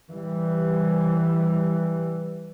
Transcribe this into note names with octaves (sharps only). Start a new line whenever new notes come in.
E3 G3